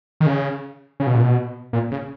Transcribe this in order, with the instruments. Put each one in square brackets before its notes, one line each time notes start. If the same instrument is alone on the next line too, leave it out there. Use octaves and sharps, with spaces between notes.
[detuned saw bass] D#3
C#3
C#3
B2
A#2
B2
A#2
C#3